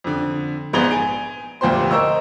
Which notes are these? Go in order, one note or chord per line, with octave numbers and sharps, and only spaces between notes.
F2 D3
A#1 G#2 B3 G#6 F7 G7
G#5 D7
F1 D2 A#2 G4 C5 C6
A#4 C5 D#5 C#6 E6